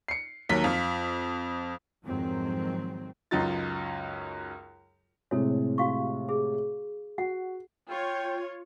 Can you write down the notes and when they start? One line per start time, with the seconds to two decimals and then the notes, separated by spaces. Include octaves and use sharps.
0.08 C7 C#7
0.49 D#2 D#3 F#3 A#3 B6
0.64 F2 F4
2.05 F2 G#2 D#3 F#3 C4
3.31 C#2 F#2 D#4 F4 A6
5.31 A2 C3 G#3 A4 C#5
5.78 F#4 F5 C#6
6.29 G#4
7.18 F#4 F#5
7.89 F4 C#5 G5